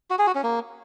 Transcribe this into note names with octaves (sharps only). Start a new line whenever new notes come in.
F#4
G#4
F#4
C#4
A#3